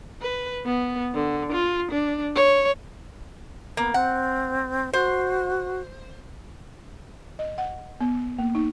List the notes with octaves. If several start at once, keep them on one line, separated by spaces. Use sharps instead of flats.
B4
B3
D3
F4
D4
C#5
A#3 B3
C4 F#5
F#4 C5
D#5
F#5
B3
A#3
D#4